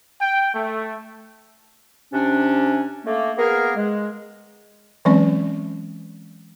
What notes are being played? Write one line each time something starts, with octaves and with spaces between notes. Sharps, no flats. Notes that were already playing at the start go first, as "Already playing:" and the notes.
G5
A3
C3 C#4 D4
A3 A#3
A#3 B3 G#4 A#4
G#3
E3 F#3 G#3 C4 C#4 D5